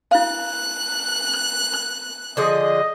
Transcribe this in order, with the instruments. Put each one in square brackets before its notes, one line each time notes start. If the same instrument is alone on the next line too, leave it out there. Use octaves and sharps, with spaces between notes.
[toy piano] E4 F5 [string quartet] F#6
[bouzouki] D3 F3 G#4 [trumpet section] D#5